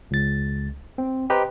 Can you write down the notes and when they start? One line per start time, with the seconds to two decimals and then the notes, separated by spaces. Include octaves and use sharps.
0.11 C#2 A6
0.98 C4
1.30 G4 B4 C5 D#5 A#5